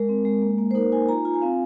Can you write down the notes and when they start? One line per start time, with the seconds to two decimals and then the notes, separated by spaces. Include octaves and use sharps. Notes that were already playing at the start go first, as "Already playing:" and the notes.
Already playing: G#3 A#4
0.09 C4
0.25 G#3
0.42 A#3
0.58 A#3
0.71 C5
0.75 D#4 A#4
0.92 D#4 G#5
1.08 F4 A#5
1.17 G#5
1.25 F4 A#5
1.34 G#5
1.41 C4 F5